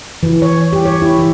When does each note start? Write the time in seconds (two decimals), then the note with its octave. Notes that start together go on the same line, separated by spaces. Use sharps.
0.23 E3
0.42 C#5
0.73 G4
0.85 C#5
1.02 E4
1.19 E3